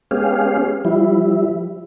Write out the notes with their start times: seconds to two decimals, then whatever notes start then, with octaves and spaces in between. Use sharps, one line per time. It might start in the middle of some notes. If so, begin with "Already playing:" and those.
0.11 G#3 B3 C#4 G4 G#4 F5
0.85 F3 G3 E4